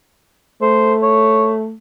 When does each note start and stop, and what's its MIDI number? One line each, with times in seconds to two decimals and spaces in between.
0.62 1.74 57
0.62 0.94 72
1.02 1.53 73